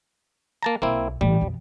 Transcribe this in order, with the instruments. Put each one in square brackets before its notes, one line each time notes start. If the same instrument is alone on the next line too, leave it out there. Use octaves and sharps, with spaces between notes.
[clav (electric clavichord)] A#3 A5 A#5
[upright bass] B1 [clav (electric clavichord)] A#3 C4 E4
[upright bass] A1 [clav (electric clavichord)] G3
[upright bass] F2 B2